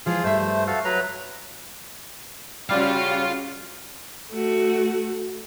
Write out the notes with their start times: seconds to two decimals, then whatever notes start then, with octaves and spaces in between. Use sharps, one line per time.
0.06 E3 F3 G#3 F4 G#4 F5
0.24 G2 G3 A3 C5 E5
0.67 F#4 A4 F5
0.85 F#3 B4 A#5
2.70 C#3 G3 F4 F#4 C#5 F5
4.31 A3 F#4